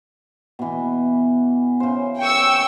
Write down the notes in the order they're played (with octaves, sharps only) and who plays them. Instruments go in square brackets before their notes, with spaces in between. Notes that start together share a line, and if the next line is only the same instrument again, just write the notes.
[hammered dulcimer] B2 E3
C#3 C5
[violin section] G5 C#6 E6